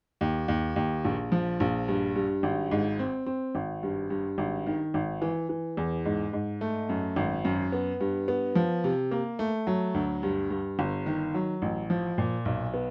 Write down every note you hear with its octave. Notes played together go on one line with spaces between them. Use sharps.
D#2
D#2
D#2
A#1
F3
A#1
G2
G2
G#1
G#2
C4
C4
G#1
G2
G2
G#1
D#3
G#1
E3
E3
E2
G#2
G#2
A3
F#2
G#1
F#2
B3
G2
B3
F3
C3
A#3
A3
F#3
D2
G2
G2
G1
D#3
F#3
A1
F3
A#2
B1
B3